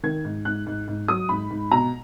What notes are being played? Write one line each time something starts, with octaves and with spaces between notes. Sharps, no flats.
D#3 G#6
G#2
G#2 F#6
G#2
G#2
F#3 D#6
G#2 B5
G#2
B2 A#5